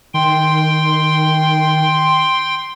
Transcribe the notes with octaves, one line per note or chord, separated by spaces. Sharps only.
D#3 G5 C6